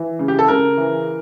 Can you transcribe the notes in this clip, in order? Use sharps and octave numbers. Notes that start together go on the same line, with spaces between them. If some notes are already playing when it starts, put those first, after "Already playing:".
Already playing: E3
C#3
G4
A4
C#3 A#4
E3